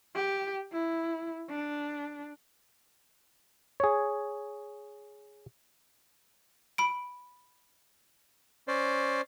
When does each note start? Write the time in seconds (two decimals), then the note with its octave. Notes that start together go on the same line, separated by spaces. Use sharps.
0.15 G4
0.72 E4
1.49 D4
3.80 G#4 C#5
6.78 B5 D7
8.68 C#4 C5 D5